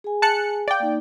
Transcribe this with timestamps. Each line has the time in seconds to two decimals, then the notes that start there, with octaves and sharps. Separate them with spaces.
0.04 G#4 G#5
0.22 A5 F#6 C#7
0.68 D5 F5 G5
0.80 A#3 D#4